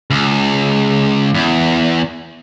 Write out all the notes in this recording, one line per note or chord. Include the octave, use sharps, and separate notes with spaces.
C#2
E2